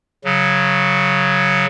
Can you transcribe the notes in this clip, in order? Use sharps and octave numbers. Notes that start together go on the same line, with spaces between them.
C#3 F#3